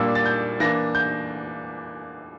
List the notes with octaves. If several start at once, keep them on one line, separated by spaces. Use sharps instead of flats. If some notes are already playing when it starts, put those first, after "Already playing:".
Already playing: A#2 G3 A#3 D4 E6
A6
G6
E3 A#3 D4 A#6
G6